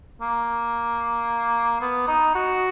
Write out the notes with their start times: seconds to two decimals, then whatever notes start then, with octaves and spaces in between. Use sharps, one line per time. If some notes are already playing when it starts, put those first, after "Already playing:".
0.21 A#3
1.81 B3
2.08 D#4
2.35 F#4